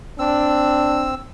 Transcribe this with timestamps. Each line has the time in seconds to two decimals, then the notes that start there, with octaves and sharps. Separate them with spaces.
0.19 C4 D4 E6